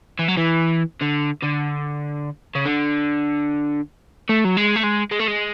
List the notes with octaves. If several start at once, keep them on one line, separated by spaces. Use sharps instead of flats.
E3
F#3
E3
D3
D3
C#3
D3
A3
F#3
G#3
A3
G#3
G#3
A3
G#3